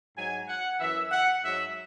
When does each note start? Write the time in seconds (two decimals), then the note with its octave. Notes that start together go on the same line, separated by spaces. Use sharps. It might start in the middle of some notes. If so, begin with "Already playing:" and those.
0.17 G#2 F#3 G#5
0.48 F#5
0.80 F#2 E3 E5
1.11 F#5
1.42 G#2 F#3 E5